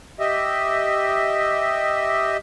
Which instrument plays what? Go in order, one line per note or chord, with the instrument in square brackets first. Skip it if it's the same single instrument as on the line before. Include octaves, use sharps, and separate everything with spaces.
[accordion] G4 D#5 E5